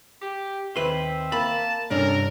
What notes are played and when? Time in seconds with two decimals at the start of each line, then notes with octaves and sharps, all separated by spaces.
0.22 G4
0.76 D#2 C4 B4 E5 C6
1.32 A#3 A5 B5
1.90 C2 G2 C#4 D4 A4 A#4